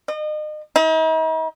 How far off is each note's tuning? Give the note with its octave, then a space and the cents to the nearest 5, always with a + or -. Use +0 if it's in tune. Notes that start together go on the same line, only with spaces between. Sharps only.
D#5 -35
D#4 +45